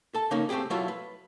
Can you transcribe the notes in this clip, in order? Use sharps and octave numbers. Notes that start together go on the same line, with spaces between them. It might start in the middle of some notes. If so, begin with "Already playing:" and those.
A4 A5
C#3 A#3 C#4 D#4
A3 C4 D4 G4 G#4
F#3 A3 E4 F4 E5
B4